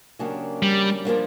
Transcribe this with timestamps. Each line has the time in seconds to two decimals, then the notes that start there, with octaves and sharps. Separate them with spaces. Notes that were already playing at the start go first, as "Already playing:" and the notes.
0.19 C#3 F#3 A#3 D4 G4
0.63 G3
1.05 F3 A#3 D4